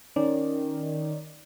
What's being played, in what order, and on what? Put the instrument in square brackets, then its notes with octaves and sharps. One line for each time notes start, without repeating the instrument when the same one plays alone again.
[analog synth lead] D#3 [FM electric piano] C#4 D5